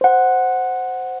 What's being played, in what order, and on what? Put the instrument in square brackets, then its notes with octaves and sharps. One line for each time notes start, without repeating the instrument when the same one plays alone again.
[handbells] C5 F#5